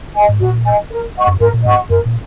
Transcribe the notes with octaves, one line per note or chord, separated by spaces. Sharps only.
D#5 G#5
G#2
A#2 F#4
D#5 G#5
A#4
D#5 F#5 C#6
F#2
G#2 A#4
A#2
G#2 D#5 F#5 C#6
F#2 A#4
A#2